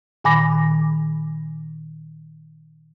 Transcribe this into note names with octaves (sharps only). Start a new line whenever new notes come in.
A#2 D#3 G#5 B5 D6 A#6